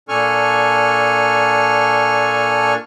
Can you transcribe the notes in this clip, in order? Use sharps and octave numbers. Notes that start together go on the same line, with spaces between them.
A#2 D4 A4 G#5 C#6 F6